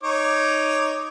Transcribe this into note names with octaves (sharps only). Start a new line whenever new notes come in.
D#4 C#5 D6